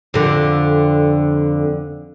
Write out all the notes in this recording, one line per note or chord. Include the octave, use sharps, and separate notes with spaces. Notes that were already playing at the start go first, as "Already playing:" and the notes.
F2 D3